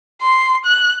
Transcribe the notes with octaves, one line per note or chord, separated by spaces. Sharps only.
C6
F#6